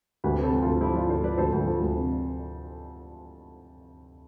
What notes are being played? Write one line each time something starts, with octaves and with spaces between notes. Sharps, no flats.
D2 G4 B4
C3 A4 C5
F3
D2 F4 A4
F3 E4 G4
F3 D4 F4
D2 A4 C5
F3 B4 D5
D2 A4 C5
D2
F3
D2
C3